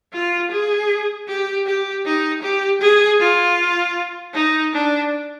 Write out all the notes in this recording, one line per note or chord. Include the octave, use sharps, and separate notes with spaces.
F4
G#4
G4
G4
D#4
G4
G#4
F4
D#4
D4